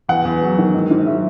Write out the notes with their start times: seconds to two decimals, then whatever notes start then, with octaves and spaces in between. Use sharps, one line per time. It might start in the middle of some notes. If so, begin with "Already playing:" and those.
0.09 E2 F#5
0.25 E2
0.42 F#3
0.58 D#3
0.74 G#2
0.91 G#2
1.06 F#3 E5